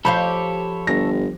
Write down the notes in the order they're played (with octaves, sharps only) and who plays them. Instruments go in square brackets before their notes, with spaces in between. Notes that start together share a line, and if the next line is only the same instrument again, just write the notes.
[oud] F3 G4 F5 [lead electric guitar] A4 C#5 [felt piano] B5 G6
[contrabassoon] G1 [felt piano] A#6